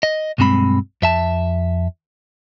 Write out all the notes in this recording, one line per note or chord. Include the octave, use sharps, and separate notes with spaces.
D#5
B1 G2 G#3 C4 B5
F2 E5 A5